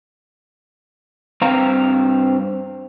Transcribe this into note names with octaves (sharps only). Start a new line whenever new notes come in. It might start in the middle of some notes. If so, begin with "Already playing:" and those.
G2 C4 F5 A#5